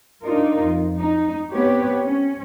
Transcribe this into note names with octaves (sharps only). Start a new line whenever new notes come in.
D4 D#4 F4 A#4
F2
D#4
B3 C4 G4 B4 C#5
C#4